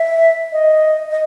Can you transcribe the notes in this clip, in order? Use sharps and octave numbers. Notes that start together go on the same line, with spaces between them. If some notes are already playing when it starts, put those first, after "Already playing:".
Already playing: E5
D#5
D#5